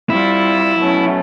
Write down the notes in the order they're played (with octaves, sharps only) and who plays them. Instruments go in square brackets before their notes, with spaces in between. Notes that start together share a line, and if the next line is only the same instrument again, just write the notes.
[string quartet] G3 C4 F4 [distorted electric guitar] E4
[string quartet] B2 F#3 A3 C#4